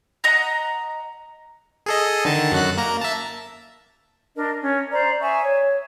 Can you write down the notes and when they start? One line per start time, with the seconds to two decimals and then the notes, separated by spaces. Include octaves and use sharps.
0.24 D#5 F#5 A#5
1.86 G#4 A4 D#5
2.25 D3 D#3 A5
2.52 F#2 F#4 F#6
2.77 A#3 A#5
3.01 E5 A5
4.36 D4 A#4 D#5
4.60 C#4
4.91 C5 D5 A#5
5.21 E5 G#5 C#6 D#6
5.44 C#5